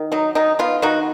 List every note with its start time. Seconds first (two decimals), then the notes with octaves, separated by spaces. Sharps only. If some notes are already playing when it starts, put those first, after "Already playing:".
Already playing: D#3
0.12 F#3 D#4
0.35 D#3 D#4
0.59 B3 F4
0.82 D#3 D#4 F#4